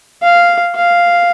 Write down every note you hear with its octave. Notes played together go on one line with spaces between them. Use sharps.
F5
F5